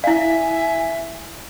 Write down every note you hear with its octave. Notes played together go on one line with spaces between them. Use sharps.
E4 E5 F5 G#5